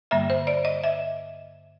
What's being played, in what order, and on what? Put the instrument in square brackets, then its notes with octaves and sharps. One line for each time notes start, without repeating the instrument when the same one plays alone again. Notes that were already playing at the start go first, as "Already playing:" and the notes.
[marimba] G2 D3 G3 A#3 E5
C5
D5
D#5
E5